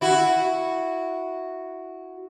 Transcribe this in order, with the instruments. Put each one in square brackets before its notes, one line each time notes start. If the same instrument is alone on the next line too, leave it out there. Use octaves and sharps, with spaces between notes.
[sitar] E4 F#4